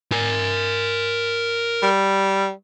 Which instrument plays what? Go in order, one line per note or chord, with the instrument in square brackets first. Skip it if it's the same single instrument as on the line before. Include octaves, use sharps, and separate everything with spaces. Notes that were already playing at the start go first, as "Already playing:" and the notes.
[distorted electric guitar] A#4 G#5
[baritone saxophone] G3